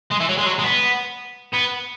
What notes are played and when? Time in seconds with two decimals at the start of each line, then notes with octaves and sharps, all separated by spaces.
0.11 G#3
0.21 E3
0.29 F#3
0.38 G#3
0.46 F#3
0.59 G#3
0.64 B3
1.53 B3